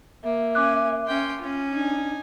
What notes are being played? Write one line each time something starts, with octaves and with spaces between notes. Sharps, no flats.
A#3 E5
C#4 G#5 D6 F#6
C#4 G5 C6
C#4 F4
D4 D#4 G#5